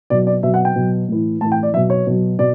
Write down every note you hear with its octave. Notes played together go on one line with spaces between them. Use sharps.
B2 F#3 D5
D5
B2 F#3 E5
F#5
G5
B2 F#3
A2 E3
A2 E3 A5
G5
D5
B2 F#3 E5
C#5
B2 F#3
B2 D5